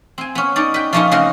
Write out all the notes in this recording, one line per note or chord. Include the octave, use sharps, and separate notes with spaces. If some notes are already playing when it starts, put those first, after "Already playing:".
C4 G#5
B3 C#4
C#4 D#4 D5
B4 G5
F3 A3 A#3 C#4 D#4 F4
C#3 C4 F#4 A#4 D#5